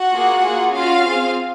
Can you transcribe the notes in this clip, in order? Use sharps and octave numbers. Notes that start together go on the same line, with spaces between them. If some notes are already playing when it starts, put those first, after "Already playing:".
Already playing: F#4 F#5
A#3 F4 G#4
A#3 F4 G#4
C#4 F4 F#4 F5
C4 F4 G#4